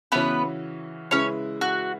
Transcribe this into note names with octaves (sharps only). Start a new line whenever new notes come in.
C#3 E3 B3 C#4 F#4 B4 E5
C#3 G#3 C#4 E4 B4 C#5 E5
F#4